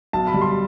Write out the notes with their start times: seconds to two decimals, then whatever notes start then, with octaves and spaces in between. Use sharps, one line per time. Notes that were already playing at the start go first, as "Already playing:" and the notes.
0.13 B1 A5
0.27 B5
0.34 G3
0.41 C6